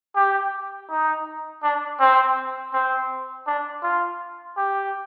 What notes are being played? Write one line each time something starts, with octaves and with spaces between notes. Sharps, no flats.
G4
D#4
D4
C4
C4
D4
F4
G4